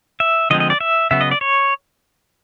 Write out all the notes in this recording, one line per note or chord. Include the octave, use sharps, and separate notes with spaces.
E5
D3 F3 G#3 C4 D#5
D#5
D5
E5
C#3 F#3 B3 E5
D#5
D5
C#5